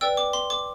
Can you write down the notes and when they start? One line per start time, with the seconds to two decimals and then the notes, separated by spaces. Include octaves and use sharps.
0.01 B4 D5 G5 E6
0.17 D6
0.33 C6
0.50 D6